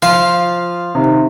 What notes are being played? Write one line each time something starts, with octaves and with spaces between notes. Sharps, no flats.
F3 F5
C3 D#3